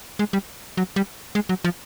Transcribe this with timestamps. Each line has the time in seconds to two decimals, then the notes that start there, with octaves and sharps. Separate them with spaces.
0.19 G#3
0.33 G3
0.77 F#3
0.96 G3
1.35 G#3
1.49 F#3
1.64 F3